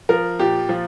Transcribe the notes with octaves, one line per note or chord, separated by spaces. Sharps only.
F3 A#4
A#2 G4
F3